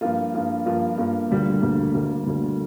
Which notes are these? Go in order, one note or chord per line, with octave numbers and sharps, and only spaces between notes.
G2 F3 A#3 F4
G2 F3 A#3 F4
G2 F3 A#3 F4
G2 F3 A#3 F4
D2 D3 G3 A#3
D2 D3 G3 A#3
D2 D3 G3 A#3
D2 D3 G3 A#3